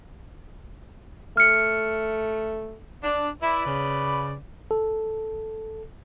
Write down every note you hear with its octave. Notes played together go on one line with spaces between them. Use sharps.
A3 F6 C#7
D4
E4 B4 D5
C#3
A4